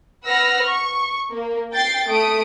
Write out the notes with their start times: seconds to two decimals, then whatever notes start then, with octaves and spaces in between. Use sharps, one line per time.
0.24 B4 F#5 E6 F6 A#6
0.65 C#6
1.31 A#3
1.73 G5 G6 A6 C7
2.08 A3 D#6 D7